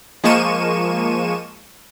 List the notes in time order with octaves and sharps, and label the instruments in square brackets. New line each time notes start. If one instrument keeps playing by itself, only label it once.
[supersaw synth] F3 G#3 A#3 C#6 D#7 E7